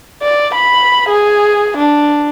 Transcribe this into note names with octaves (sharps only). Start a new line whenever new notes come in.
D5
B5
G#4
D4